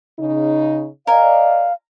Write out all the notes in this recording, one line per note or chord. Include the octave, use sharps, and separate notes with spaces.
C#3 D#4
A#4 D5 D#5 F5 G#5